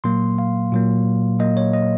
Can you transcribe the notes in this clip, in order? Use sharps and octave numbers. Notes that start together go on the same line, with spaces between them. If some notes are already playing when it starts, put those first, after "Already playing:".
A#2 F#3 A#3 C6
F5
A#2 F#3 A#3
A#2 F#3 A#3 D#5
C#5
D#5